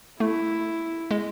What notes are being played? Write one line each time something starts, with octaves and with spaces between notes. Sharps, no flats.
A3 E4
G#3